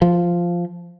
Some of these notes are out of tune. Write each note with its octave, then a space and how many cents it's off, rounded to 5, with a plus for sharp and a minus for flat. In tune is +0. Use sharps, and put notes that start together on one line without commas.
F3 -5